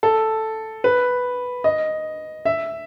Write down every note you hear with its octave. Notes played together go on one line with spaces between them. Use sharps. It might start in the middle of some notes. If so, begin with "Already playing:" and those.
A4
B4
D#5
E5